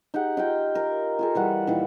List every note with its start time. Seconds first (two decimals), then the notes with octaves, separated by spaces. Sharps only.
0.14 D#4 G4 G#4 F#5
0.37 D#4 F4 G5
0.75 A#4
1.19 F4 G#4 A4
1.35 E3 G3 F#5
1.67 A#2 D#3 E3